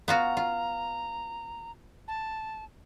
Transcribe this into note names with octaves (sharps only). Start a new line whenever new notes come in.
B3 F4 F#4 A#5
F4
A5